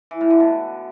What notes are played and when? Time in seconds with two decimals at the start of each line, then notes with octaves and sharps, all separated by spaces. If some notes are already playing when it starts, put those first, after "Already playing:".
0.11 E3
0.21 A2
0.30 D3
0.40 B2